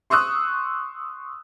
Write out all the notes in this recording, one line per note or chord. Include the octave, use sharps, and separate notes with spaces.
C6 C#6 D#6 E6 F#6